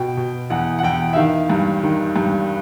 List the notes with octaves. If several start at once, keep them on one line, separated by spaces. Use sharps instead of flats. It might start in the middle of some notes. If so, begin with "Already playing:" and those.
Already playing: B2 G5
B2
E2 F#5
F#5
E2 G5
E5
D#3 F5
G2
D#3
G2